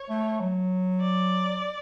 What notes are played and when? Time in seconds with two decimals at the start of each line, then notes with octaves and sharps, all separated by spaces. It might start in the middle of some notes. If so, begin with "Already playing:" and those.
Already playing: C#5
0.10 A3
0.40 F#3
1.01 D5